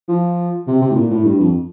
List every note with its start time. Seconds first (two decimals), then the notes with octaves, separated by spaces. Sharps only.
0.08 F3
0.67 C3
0.82 C3
0.91 A2
0.96 A#2
1.11 A2
1.25 G2
1.40 F2